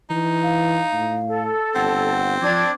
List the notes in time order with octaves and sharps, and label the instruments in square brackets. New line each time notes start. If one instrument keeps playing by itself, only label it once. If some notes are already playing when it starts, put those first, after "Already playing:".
[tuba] E3 [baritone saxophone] D#4
[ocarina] F5
[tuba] A2
[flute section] A4
[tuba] G1 [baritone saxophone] C4 [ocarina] F#5
[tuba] F3 [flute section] D4 G#6 [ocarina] D6